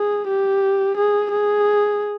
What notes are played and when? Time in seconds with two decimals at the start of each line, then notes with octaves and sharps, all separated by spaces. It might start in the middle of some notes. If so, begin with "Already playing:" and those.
Already playing: G#4
0.28 G4
0.97 G#4
1.31 G#4